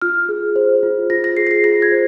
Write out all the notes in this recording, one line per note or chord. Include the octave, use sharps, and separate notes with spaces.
F4 F6
G#4
C5
F4
F4 A#6
A#6
G#4 C7
A#6
C7
F4 A#6
G#6
C5